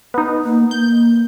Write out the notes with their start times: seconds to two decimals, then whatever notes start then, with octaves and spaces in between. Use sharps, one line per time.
0.14 B3 D#4
0.44 A#3
0.71 A#3 G6